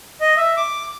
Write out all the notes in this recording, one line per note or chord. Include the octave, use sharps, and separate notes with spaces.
D#5
E5
D6